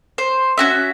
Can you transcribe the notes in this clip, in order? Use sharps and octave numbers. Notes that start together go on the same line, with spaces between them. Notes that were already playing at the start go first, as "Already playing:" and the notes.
C5
C#4 F#4 E5